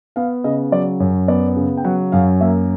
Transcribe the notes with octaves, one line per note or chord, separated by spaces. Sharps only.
B3 F5
C#3 D#5
F#3 D5
F#2 C#5
B3 D5
C#3
G5
F#3 F#5
F#2 F5
A#3 E5